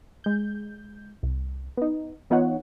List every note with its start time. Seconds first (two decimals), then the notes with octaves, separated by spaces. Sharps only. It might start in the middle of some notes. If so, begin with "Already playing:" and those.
0.24 G#3 G6
1.23 C2
1.77 B3 D#4
2.30 E3 B3 D#4 F4 C#5 F#5